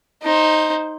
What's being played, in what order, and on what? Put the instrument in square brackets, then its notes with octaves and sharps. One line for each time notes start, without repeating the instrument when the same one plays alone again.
[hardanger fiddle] D#4 C5